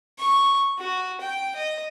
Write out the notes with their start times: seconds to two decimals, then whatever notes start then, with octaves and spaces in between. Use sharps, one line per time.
0.19 C#6
0.79 F#4
1.21 G5
1.56 D#5